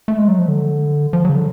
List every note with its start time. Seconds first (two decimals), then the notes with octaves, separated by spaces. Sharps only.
0.08 A3
0.18 G#3
0.28 F#3
0.39 F3
0.48 D3
1.13 F3
1.25 F#3
1.29 C#3
1.35 D3